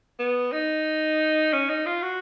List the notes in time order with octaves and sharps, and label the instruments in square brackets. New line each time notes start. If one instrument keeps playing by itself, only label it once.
[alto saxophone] B3
D#4
C#4
D#4
F4
F#4